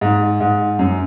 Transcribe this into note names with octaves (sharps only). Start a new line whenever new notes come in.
G#2
G#2
F#2